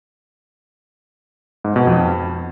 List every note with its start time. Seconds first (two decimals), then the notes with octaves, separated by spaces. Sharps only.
1.64 G#2
1.76 B2
1.87 F2